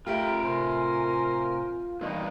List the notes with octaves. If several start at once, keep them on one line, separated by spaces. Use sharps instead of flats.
A3 F4 G4 A#4 E5 G5
A2 C3 A#4 C5 G#5
E2 G2 A#3 D#4